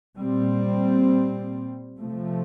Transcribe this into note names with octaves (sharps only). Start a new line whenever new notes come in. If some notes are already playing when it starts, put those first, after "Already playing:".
A#2 G3 C4
C3 F3 A3